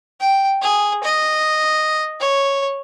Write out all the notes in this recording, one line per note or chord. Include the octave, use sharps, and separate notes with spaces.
G5
G#4
D#5
C#5